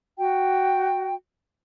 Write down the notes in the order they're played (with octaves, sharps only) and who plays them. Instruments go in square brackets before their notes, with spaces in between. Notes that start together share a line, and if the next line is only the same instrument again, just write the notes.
[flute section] F#4 G5